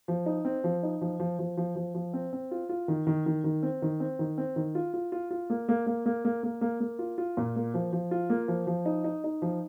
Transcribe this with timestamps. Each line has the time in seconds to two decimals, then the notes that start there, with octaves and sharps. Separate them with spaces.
0.08 F3
0.26 D#4
0.45 C4
0.64 F3
0.83 D#4
1.01 F3
1.20 F3
1.39 F3
1.57 F3
1.76 F3
1.95 F3
2.14 C4
2.33 C4
2.51 F4
2.69 F4
2.88 D#3
3.07 D#3
3.26 D#3
3.44 D#3
3.63 C4
3.82 D#3
4.00 C4
4.19 D#3
4.38 C4
4.56 D#3
4.75 F4
4.94 F4
5.12 F4
5.31 F4
5.50 A#3
5.69 A#3
5.87 A#3
6.06 A#3
6.25 A#3
6.43 A#3
6.61 A#3
6.80 A#3
6.99 F4
7.18 F4
7.37 A#2
7.56 A#3
7.74 F3
7.93 F3
8.11 F4
8.30 A#3
8.48 F3
8.67 F3
8.85 D#4
9.04 D#4
9.24 D#4
9.42 F3